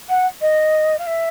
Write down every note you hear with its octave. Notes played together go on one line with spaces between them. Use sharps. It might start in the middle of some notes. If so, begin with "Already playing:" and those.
F#5
D#5
F5
E5